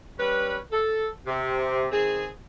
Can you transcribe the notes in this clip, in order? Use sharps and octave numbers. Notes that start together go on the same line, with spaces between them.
G3 C#4 B4
A4
C3
D#3 C4 G#4